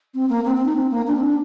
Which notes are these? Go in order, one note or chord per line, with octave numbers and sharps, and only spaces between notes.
C4
A#3
C4
C4
D#4
C4
A#3
D4
C4
D4